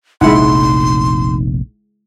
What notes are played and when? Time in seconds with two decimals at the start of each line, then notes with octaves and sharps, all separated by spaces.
0.21 F1 A#1 G#3 D#4 E4 F#5 C6